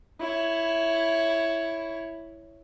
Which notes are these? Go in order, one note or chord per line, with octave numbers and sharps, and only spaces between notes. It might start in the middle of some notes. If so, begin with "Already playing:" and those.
E4 C#5